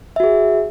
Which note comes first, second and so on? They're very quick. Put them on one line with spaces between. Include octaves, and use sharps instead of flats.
E5 F#4 G#4